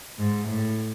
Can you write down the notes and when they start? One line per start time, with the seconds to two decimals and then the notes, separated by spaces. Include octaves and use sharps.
0.19 G#2
0.48 A2